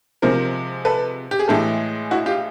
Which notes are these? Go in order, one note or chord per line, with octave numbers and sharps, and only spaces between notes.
C3 F3 G#3 C4 A#4 C5
A4 B4
G4
G#4
A2 E3 G#3 G4 A4
E4 F#4
F4 G4